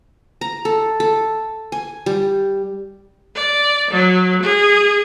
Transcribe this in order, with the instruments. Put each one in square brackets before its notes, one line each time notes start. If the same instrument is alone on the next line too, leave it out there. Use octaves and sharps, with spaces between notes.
[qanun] A#5
A4
A4
G#5
G3
[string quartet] D5
F#3
G#4